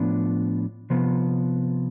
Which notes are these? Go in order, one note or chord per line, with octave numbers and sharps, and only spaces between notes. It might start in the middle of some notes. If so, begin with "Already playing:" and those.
Already playing: A2 F3 B3 D4
C3 F3 B3